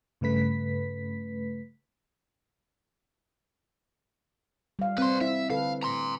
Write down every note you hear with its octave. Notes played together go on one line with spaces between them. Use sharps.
G2 C#3 A3 B4 B6
G3 F5
C4 B4 C6
E4 E5
D3 A4 B4 F5
A#5 C6